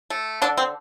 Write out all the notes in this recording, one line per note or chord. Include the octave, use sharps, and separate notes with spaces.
A3
D3 D4
C4